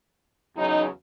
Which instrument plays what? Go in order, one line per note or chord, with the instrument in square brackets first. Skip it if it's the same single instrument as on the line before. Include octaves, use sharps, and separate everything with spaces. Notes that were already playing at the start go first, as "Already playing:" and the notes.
[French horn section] E2 C#3 F#3 D#4